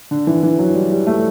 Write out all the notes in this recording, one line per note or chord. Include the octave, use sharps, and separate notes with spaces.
D3
E3
E3
F#3
G3
G3
A3